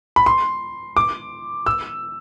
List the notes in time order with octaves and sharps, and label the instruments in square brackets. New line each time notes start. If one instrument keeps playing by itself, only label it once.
[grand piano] B5
C6
D6
E6